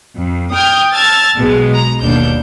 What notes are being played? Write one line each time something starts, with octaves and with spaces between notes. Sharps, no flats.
F2
G5 D#6 F6 G6 G#6
A5 E6 F6 G#6 A6
B1 B2 G#3 B3
A#5
G1 D#2 B2 D4 G6